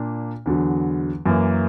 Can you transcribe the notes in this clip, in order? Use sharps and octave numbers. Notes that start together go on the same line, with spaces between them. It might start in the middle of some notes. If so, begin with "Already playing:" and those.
Already playing: A#2 A#3 D4
E2 D3 F#3
F#2 E3 A#3